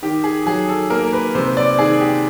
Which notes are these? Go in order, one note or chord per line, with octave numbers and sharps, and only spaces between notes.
D#3 G4
G#4
F#3 G#4
A4
A#3 A#4
B4
C3 C5
D5
D#3 G#4
G4